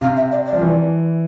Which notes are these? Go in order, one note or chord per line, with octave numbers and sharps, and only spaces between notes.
C3 F5
E5
D5
D5
F3
E3